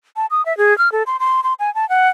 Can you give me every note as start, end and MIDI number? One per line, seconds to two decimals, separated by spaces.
0.16 0.26 81
0.31 0.44 87
0.46 0.56 76
0.58 0.76 68
0.78 0.91 89
0.92 1.03 69
1.07 1.17 84
1.20 1.43 84
1.44 1.54 84
1.60 1.73 80
1.75 1.88 81
1.89 2.09 78